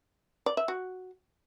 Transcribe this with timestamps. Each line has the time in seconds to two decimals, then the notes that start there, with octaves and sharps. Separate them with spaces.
0.46 D5
0.57 E5
0.68 F#4